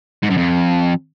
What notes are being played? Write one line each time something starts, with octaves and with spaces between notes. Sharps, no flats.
G#2
F#2
F2